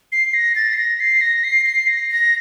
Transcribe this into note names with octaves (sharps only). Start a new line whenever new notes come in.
C7
A#6
A6
C7
A#6
C7
A#6
C7
C7
A#6
A#6